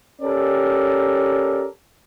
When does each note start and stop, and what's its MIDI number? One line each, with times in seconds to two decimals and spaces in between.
0.22 1.66 61
0.22 1.66 67
0.22 1.66 69
0.22 1.66 70
0.22 1.66 74